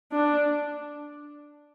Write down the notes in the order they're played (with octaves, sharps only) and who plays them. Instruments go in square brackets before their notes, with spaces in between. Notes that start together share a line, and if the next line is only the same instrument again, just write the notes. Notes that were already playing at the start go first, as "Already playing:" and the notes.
[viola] D4